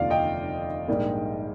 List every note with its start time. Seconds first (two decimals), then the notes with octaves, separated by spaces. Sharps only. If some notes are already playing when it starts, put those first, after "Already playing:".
Already playing: F1 D#2 D3 F3 C4 D5 F5
0.10 D#5 G5
0.88 A#1 G#2 G3 A#3 D4